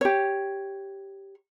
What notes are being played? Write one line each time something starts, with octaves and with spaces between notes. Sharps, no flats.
G4 C#5